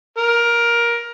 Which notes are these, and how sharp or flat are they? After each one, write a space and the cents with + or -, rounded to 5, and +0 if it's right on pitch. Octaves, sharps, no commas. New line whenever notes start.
A#4 +15